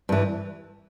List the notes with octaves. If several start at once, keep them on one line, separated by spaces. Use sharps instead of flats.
G2 E3